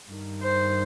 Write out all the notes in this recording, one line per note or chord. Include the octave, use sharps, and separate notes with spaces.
G2 D#3
C5